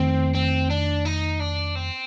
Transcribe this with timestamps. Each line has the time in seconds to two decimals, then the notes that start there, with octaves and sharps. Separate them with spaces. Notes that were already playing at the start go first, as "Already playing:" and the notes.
Already playing: F2 D#3 A3 C4
0.34 C4
0.70 D4
1.05 D#4
1.40 D4
1.75 C4